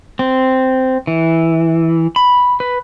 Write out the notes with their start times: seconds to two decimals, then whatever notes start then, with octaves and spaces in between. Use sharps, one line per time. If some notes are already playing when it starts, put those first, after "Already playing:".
0.19 C4
1.07 E3
2.16 B5
2.60 B4